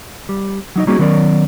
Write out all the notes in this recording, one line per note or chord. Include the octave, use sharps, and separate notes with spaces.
G3
F#3 D#4 D#5
G3 A#3 C#4 D#4 F#4 G#4
D#3 F#3 B3 C#4 A#4 D5